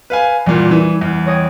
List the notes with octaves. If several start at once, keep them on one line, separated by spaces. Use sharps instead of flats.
B4 F5 G#5
E2 A#2 G3
E3
E2
C#5 D#5 G5